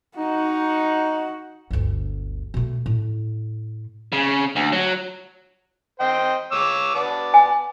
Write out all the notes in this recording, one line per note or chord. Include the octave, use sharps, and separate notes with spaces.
D#4 F#4
G1 D2
B2 A3
A2
C#3
D2
F#3
C5 D#5 G5
C#5 D6 E6
B3 D5 A5
G#5